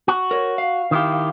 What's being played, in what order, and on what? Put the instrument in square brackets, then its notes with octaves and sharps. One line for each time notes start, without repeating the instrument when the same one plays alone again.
[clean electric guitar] F#4
[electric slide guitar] A#4 C#5
F5
[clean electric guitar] D#3 E4 G4